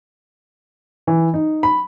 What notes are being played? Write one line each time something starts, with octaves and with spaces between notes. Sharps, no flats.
E3
D#4
B5